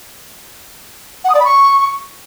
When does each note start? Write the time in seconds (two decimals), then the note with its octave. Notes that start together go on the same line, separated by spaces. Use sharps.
1.24 F#5
1.30 D#6
1.35 D5
1.40 B5
1.45 C#6